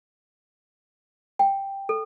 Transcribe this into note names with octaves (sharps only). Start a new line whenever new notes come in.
G5
A4